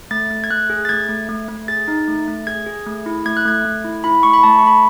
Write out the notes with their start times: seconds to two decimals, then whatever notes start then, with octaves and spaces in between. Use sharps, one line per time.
0.11 A3 A6
0.30 A3
0.44 G#6
0.51 A3 F#6
0.70 G#4
0.85 A6
0.89 A3 G#6
1.09 A3
1.29 A3
1.48 A3
1.68 G#4 A6
1.88 D#4
2.08 A3
2.28 A3
2.47 G#4 G#6
2.66 G#4
2.87 A3
3.06 E4
3.25 A3 G#6
3.37 F#6
3.45 A3 G#6
3.65 A3
3.85 E4
4.04 E4 B5
4.23 A3 C#6
4.33 B5
4.43 A3 A5
4.59 C#6
4.63 A3 B5